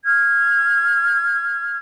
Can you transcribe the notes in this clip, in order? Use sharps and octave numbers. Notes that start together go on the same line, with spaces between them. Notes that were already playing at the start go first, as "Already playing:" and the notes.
F6 G#6